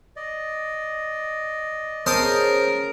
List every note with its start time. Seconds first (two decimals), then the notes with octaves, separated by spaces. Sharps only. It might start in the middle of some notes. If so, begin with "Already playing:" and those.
0.16 D5 D#5
2.06 C#3 A#4 C5 A5 D#6